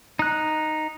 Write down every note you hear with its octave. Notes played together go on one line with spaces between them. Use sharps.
D#4 F#6